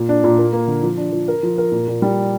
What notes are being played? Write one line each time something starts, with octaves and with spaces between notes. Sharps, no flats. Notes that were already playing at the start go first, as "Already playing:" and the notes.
Already playing: A#2
D4
A#2
A#3
A#3
D3
F3
D4
F3
A#4
F3
A#4
A#2
A#2
G3